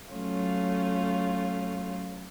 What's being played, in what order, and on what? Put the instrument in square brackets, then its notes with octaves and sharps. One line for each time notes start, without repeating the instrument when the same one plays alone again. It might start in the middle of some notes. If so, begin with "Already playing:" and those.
[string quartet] F#3 A3 C#4 F4